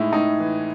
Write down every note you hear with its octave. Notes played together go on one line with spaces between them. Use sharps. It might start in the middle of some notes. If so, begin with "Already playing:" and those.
Already playing: A2 G#3 D#4 E4
A2 D#4
E3